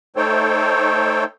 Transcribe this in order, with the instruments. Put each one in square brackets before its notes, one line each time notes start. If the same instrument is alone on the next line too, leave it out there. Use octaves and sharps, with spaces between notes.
[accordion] A3 D#4 A4 C5 C#5 G5